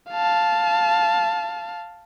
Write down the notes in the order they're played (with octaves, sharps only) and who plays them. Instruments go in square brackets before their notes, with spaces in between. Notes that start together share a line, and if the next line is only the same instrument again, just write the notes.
[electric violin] F5 A5